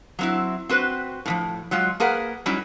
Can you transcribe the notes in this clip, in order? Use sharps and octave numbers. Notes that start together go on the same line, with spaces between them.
F#3 C4 E4
C4 F#4 B4 C5
A2 C3 F3
F#3 G#3 F4
A#3 G#4 A#4 B4 F#5
F#3 G3 C#4 D#4 E4 F#4